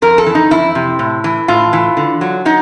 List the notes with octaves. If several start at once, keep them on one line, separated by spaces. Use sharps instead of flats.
F2 A#4
A4
E3
D#4
F2 E4
C3
A2
E3
A2 F4
E3
D3
F#3
F#3 D#4